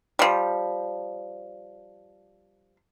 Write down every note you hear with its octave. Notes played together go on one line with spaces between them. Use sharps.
F3 G3